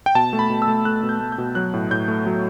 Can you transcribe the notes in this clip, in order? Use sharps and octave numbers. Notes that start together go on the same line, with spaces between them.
G5
B2 A5
A3
B5
B2
E6
A3
A3 F#6
B2
G6
A3
G6
B2
F#3 F#6
A2
A2 G6
A3
F#3